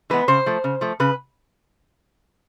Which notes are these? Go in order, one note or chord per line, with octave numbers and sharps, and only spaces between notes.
E3 G#3 B3 B4
C#3 C5
F3 A3
C#3
F3 A3
C#3 B4